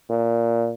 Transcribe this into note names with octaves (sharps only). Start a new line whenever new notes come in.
A#2